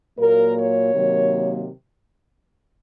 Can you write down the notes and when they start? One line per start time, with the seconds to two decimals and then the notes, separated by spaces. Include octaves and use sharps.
0.18 A#2 F#3 A#3 A#4
0.57 C#5
0.94 C3 D#3 F#3 A#3